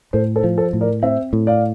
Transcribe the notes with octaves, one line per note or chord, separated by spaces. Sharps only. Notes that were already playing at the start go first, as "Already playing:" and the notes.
A2 A4 C5
A4 C5
F3
A4 C5
A2
A#4 D5
C4 C5 E5
A2
D5 F5